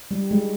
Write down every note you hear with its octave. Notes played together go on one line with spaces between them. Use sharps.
G3
G#3